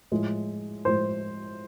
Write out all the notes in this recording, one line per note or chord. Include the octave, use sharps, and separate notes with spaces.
A2 F3 G#3
A2 F3 G#3 C5